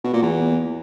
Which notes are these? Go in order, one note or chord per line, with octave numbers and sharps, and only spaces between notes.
B2
A#2
E2